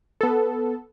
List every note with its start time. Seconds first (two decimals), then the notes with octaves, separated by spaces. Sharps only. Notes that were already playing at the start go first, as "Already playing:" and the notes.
0.21 B3 A4